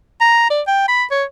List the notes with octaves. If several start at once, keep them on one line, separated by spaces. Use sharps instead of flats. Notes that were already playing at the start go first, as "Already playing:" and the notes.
A#5
D5
G5
B5
C#5